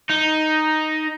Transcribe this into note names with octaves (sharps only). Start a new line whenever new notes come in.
D#4